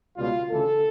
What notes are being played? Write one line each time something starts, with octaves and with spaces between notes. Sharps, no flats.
C#2 B2 G3 F4
D2 C#3 E3 A4